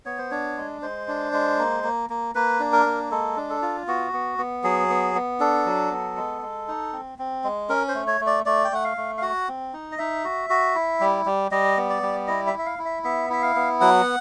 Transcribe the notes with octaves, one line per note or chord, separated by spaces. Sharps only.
B3 C#5
C5
D4 C#5
G#3
G#3 C5
D4
G#3
A#3
A#3
A#3
A#3 B4
D4
A#4
A#3
G#3 A4
D4
A4
F4
B3 F#4
B3
B3
F#3 G#4
B3
B3
D4 A4
F#3
B3
G#3
G#3
D#4
C4
C4
G#3
C#4 A#4
C5
A3
C#5
A3
D5
A3 D5
G5
A3 F#5
F5
A3
F5
F#4 F#5
C4
D#4
D#5
D#4 E5
F#4
F#4
E4
G3
G3
G3 D#5
B3
D5
G3
E4 D#5
E5
E4
E5
F5
E4
E5
B3 E5
E4 E5
F5
B3
F#3 F#5